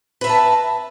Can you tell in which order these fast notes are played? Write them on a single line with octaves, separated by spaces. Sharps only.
B4 E5 A#5 A5